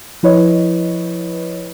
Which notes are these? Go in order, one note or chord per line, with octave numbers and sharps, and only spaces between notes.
F3 E4 B4 C#5 D#5